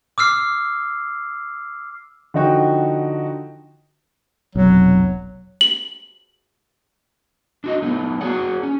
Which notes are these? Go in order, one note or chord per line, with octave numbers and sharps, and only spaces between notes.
D6 E6 F6 C7
D3 F3 D#4 F#4 G5
F1 B1 F#3
F#7
D4 F#4 D#5
A3 B3 D#4
F#4 G#4 C#5 F#5
C#4